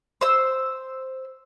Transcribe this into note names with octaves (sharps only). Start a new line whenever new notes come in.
C5 E6